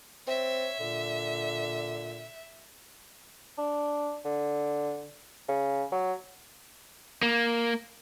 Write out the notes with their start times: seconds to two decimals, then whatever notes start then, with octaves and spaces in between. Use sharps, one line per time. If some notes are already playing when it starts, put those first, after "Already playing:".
0.27 C4 C#5 E5
0.80 A#2 D3
3.58 D4
4.24 D3
5.48 C#3
5.92 F#3
7.23 A#3